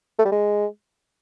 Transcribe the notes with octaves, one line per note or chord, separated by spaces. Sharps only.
A3
G3
G#3